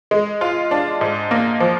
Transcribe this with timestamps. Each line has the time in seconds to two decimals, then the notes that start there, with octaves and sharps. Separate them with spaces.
0.11 G#3
0.41 F4
0.71 D4
1.01 G#2
1.31 A#3
1.60 F3